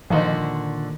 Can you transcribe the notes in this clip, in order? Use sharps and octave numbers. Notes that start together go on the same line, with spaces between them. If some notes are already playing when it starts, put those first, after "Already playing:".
A#2 D3 D#3 F3 D#4 F#4 C5